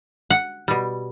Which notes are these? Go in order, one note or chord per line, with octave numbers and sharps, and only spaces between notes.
F#5
B2 G3